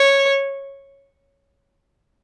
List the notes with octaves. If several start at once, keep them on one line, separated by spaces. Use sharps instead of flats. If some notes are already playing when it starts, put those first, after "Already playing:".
Already playing: C#5